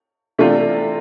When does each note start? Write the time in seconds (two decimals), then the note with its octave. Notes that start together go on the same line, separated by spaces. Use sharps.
0.39 C3 E3 A3 D4 F4